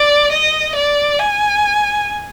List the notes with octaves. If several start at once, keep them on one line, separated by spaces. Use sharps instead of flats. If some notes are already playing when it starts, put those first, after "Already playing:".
Already playing: D5
D#5
D5
G#5